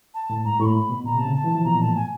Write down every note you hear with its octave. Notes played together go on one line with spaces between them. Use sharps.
A5
A2
G#2 A#5
A2 C#6
B5
B2
A#2 A#5
C3
A5
C#3
A5
E3
F3
B2 A#5
A#2
A2 A5
G#5